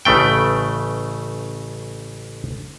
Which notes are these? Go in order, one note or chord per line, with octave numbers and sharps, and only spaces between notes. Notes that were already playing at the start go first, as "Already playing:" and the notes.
A1 C#3 A3 G5